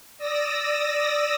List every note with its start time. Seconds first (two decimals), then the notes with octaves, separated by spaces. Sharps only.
0.18 D5 D#6 E6 A#6